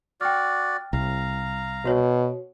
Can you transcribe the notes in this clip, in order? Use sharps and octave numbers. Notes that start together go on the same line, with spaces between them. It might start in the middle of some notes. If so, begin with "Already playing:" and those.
F#4 D5 G5 F6
C2 F5 A#5
B2 F#4 C#5